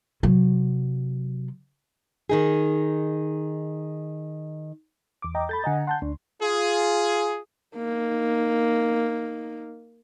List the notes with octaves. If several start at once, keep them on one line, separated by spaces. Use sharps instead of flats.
C3 F#3
D#3 D#4 G#4
E2 D6
D#5 G5 A#5
A4 B5 G6 A6
D3 D#5 F#5 G#5 A#5
F#5 A5 C6 G6
D2 D4
F4 G#4
A#3 D#4